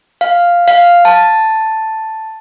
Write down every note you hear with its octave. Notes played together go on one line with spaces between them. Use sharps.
F5
F5
A5